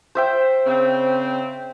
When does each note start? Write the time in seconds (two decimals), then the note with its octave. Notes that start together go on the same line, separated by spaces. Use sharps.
0.15 C5 E5 G5
0.66 C#3 C4